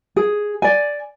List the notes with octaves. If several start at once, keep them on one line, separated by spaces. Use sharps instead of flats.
G#4
D5 G#5